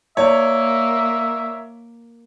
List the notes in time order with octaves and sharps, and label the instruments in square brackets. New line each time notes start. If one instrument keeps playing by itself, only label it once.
[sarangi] A#3 [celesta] E4 D5 [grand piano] C#5 [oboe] E5